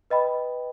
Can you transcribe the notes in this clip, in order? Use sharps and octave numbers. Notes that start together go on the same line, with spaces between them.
B4 D#5 G5 B5